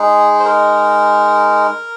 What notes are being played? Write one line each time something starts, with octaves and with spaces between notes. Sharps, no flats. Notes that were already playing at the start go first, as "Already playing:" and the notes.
Already playing: G#3 D#4 G#4
C5
A#4